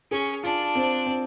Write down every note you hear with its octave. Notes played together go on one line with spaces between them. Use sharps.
C#4 G#4
D4 F4
C4
C4